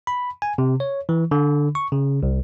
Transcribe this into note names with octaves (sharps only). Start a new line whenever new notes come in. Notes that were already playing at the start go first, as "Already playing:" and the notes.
B5
G#5
C3
C#5
E3
D3
C#6
C#3
C2